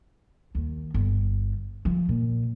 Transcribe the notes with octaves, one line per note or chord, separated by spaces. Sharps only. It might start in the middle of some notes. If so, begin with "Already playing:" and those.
D#2
G1
F3
A#2